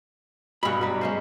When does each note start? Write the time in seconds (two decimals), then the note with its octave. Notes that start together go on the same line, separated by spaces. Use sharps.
0.63 G2 B2 C#4 F#5 B5
0.81 F#3 G3
1.01 G#3 C#4 C5